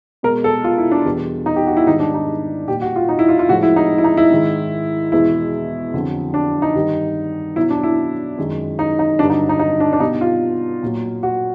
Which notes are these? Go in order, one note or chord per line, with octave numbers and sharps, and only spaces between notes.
B2 G#3 A#4
A4
F4
E4
D4
E2 B2 G3
D#4
G4
F#4
E4
G#2 D#3 G3 D#4
D4
D#4
A#2 G3 G4
F#4
F4
D#4
E4
F4
F4
A2 F3 G#3 F#4
E4
D#4
E4
D#4
E4
G#2 D#3 G#3
E2 B2 G#3 E4
F2 D3 F#3
D4
D#4
G2 D#3 G3
B2 F#3 E4
D4
E4
F#2 D#3 G#3
D#4
D#4
G2 D3 F#3 D4
D#4
D#4
D#4
D4
D4
B2 G3 D#4
F4
A#2 F#3
F#4